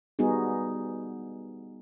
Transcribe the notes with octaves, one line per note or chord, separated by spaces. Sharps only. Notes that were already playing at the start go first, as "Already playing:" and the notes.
G3 B3 D#4 F#4 G#4